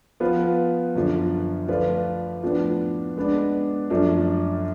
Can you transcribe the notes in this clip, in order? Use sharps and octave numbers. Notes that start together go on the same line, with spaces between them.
F3 B3 F4 B4
F#2 D3 F3
F3 A3 F4 B4 D5
A2 F3 B3 D4
G#3 B3 D4
F#2 F3 A3 D4